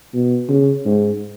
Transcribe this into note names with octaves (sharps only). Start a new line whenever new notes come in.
B2
C#3
G#2